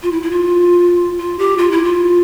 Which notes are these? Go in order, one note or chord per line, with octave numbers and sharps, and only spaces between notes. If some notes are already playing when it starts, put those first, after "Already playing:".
F4
E4
E4
F4
F4
G4
F4
E4
F4